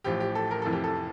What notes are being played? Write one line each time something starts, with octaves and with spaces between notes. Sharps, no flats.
A1 A2 F3 G4
G4
A4
A#4
F1 F2 E3 A4
G4
A4